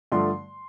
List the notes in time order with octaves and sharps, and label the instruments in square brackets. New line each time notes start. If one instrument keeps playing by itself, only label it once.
[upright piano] G2 D3 F3 A3 C6